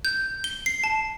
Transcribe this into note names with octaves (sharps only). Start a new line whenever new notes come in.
G6
G7
C7
A5